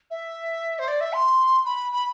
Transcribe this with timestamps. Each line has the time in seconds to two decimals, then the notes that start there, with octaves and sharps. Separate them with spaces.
0.10 E5
0.79 C5
0.87 D5
1.00 E5
1.13 C6
1.65 B5
1.92 B5